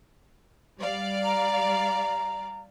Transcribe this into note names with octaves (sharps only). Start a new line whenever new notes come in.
G3 D5 F5
A#5